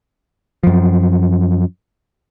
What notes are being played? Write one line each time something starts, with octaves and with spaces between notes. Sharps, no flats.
F#2 F3